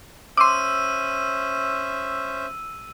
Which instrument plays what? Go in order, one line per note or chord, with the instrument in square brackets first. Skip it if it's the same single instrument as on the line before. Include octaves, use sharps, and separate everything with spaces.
[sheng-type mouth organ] C#4 C5 E5 [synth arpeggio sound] C6 D6 [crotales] E6 D#7